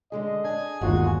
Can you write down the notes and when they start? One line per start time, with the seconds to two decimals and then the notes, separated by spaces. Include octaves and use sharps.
0.12 D3 G#3 G#4 D#5
0.44 D4 G#4 G#5
0.81 G1 D#2 G#3 F4 F#4